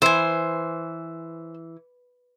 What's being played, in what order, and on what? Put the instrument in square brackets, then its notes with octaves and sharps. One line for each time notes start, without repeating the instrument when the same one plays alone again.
[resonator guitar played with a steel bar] E3 [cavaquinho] C5 G#5